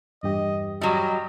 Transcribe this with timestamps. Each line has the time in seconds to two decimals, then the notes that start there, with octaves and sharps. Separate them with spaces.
0.23 E2 G2 G4 D#5
0.81 F#3 G3 D#5